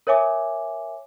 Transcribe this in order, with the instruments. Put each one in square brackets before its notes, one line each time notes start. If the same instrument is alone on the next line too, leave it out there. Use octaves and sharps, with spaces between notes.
[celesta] A#4 C#5 E5 G#5 D6